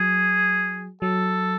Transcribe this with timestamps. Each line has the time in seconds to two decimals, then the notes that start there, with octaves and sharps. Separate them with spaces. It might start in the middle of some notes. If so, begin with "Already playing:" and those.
Already playing: F#3 G#4
1.02 F#3 A4